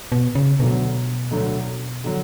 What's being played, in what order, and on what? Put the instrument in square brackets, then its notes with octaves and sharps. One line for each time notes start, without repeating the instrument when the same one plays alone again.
[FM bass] B2
C#3
[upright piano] D2 D3 F#3 [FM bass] B2
[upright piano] D2 D3 F#3
D3 F#3